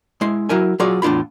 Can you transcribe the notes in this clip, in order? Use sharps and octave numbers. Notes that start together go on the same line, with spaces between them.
G#3 E4 C6
F#3 E4 A#4 G#5
F#3 F4 G#4 C#5 D5
E2 A2 D4 F4 B5